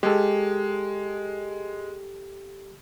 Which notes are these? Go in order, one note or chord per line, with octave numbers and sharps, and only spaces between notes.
G#3 G4 A4